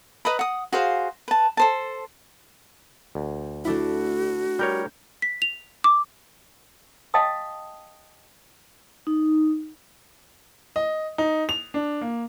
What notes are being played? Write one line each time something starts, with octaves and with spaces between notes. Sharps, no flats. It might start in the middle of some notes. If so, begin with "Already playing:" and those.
B4 D#5 A#5 B5
F#5 D#6
F#4 G#4 C5 F5
B4 A5
A4 C5 A5
D2
A3 D4 E4 F#4
G3 A#4 C#5 G6
B6
F7
D6
D#5 F5 G5 A5 D#6
D#4
D#5
D#4
F7
D4
A#3